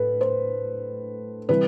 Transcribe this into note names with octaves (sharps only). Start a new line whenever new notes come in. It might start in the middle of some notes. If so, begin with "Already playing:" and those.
Already playing: A2 A4 B4
C5
C3 E3 G3 B4